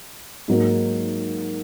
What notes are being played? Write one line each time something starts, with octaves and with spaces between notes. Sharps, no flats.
G#2 F#3 A#3